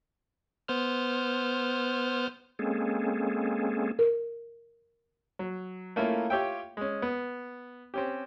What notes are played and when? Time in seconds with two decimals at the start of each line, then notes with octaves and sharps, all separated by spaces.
0.68 B3 C5 F6
2.59 G#3 A#3 C4 C#4 G#4 A4
3.99 A#4
5.39 F#3
5.96 A3 A#3 C#4 E4 F4 A#4
6.30 F4 G4 C#5 E5 G5
6.77 G#3 C#4
7.02 B3
7.94 C4 C#4 G4